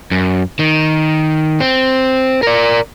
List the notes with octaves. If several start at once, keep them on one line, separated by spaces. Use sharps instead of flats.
F#2
D#3
C4
A#4 D5